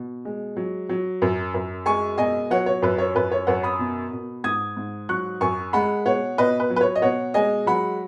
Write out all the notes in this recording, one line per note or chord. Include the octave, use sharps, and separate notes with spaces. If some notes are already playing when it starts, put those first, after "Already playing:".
Already playing: B2
G#3
F#3
F#3
F#2
F#2
G#3 G#5 C#6
B2 D#5 G#5
F#3 C#5 F#5
C#5
F#2 B4
C#5
F#2 B4
C#5
F#2 C#5 F#5
B5 D#6
B2
B2
G#2 D#6 G#6
G#2
F#3 C#6 F#6
F#2 G#5 C#6
G#3 F#5 B5
B2 C#5 F#5
B2 B4 D#5
B4
F#3
B4
C#5
D#5
B2 C#5 F#5
G#3 D#5 G#5
F#3 F#5 B5